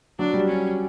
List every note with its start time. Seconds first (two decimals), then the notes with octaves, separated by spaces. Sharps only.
0.19 F#3 D4
0.34 G3
0.48 C#4